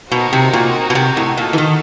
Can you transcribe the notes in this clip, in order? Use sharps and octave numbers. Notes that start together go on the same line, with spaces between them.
B2 C4 D#4 F#4 A#4
C3
A#2
B2
C3
A2
A#2 D#4 F#4 A4
E3
D#3